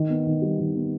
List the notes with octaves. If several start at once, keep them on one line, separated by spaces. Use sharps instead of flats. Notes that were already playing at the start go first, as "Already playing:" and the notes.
Already playing: D#3
B3
D#3
G3
D#3
B3